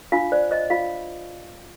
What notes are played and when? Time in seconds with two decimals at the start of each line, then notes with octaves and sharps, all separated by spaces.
0.12 D4 F4 F5
0.32 C5 D5
0.51 C5 D#5
0.70 F4 F5